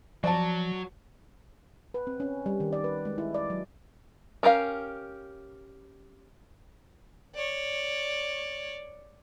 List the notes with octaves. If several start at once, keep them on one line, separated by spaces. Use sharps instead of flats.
F3 F#3 D5 A5
B4
C4
C#4
G3
D#3
D5
B4
G#3
E4
D5
F#3
C#4 G4 A#4 F5
C#5 D5